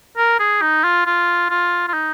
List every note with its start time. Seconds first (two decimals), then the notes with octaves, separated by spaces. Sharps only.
0.17 A#4
0.39 G#4
0.61 D#4
0.84 F4
1.06 F4
1.50 F4
1.88 F4
1.93 D#4